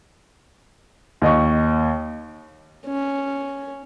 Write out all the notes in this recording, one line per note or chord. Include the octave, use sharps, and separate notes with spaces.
D#2 D#5 C#6
C#4